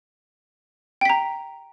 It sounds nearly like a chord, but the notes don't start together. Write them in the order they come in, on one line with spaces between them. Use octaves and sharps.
G5 B6 A#5